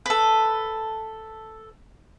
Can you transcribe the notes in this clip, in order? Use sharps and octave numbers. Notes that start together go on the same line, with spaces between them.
A4 B4